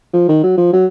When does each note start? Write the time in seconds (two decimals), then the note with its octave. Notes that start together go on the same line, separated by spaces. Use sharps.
0.14 F3
0.29 D#3
0.43 F#3
0.58 F3
0.73 F#3